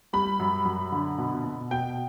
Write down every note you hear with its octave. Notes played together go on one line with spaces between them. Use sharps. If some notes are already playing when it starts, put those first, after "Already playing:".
G3 B5
F#2
F#2
D3
B2
B2
B2 G5